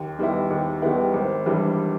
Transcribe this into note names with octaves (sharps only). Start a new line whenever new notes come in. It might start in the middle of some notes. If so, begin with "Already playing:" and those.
Already playing: D#2
D#3 G3 B3 E4
D#2
D#3 G3 B3 E4
G#1
G2 E3 G3